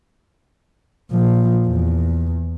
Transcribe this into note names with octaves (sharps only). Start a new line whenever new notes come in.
A#2 F3
E2